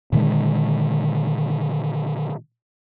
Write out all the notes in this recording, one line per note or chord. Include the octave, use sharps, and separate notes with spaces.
A#2 D3 D#3 G#3